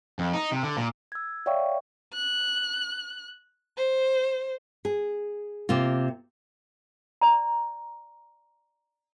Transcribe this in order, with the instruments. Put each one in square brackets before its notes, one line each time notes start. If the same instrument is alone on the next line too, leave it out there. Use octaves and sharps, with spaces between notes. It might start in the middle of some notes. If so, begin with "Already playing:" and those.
[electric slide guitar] F2
D#4
C3
D3
A#2
[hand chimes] E6 G#6
C#5 D5 E5 F5 G5 C#6
[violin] F#6
C5
[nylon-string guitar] G#4
C3 A#3 F4
[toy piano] D5 A#5